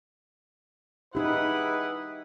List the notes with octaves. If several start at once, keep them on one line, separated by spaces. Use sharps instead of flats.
D#4 E4 G4 G#4 B4 F#5